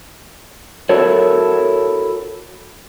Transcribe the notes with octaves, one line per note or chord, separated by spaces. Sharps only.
E4 F#4 A4 A#4 C#5